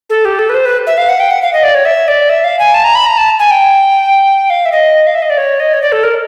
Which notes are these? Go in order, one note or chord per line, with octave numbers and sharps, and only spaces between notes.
A4
G4
A4
B4
C5
B4
E5
F5
F#5
G5
F#5
F5
D#5
D5
C#5
E5
D5
E5
F5
G#5
A5
A#5
B5
A#5
A5
G#5
G5
F5
E5
D#5
F5
E5
D#5
D5
C#5
D#5
C#5
D5
A4
A#4